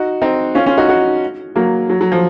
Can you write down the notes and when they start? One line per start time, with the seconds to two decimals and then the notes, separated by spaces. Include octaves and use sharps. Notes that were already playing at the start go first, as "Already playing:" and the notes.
Already playing: D#4 F#4
0.21 C4 D#4
0.55 C#4 F4
0.66 C#4 F4
0.77 D#4 F#4
0.89 D#4 F#4
1.56 F#3 A#3
1.89 F#3
2.01 F#3
2.12 F3